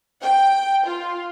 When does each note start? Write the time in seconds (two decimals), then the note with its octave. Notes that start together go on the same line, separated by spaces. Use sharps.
0.21 G5
0.86 F4